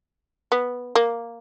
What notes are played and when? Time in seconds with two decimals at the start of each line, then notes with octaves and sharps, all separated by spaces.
0.52 B3
0.95 A#3